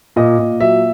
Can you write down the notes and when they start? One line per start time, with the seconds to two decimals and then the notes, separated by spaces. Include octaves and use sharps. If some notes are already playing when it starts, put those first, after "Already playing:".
0.16 A#2 D#5
0.39 A#2
0.60 F#3 E5